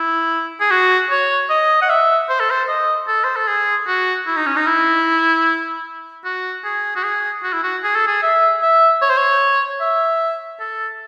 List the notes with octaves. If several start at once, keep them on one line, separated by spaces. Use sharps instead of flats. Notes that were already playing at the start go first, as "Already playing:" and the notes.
Already playing: E4
G#4
F#4
C#5
D#5
F#5
E5
C5
A4
C5
D#5
A4
C5
A4
G#4
F#4
E4
D#4
C#4
D#4
E4
F#4
G#4
F#4
G#4
F#4
E4
F#4
G#4
A4
G#4
E5
E5
C#5
C5
C#5
E5
A4